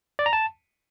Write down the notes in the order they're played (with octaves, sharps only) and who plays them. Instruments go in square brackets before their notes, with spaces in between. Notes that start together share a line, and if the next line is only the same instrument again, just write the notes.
[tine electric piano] D5
A#5
A5